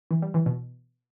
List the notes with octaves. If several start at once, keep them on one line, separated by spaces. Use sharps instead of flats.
E3
G3
E3
B2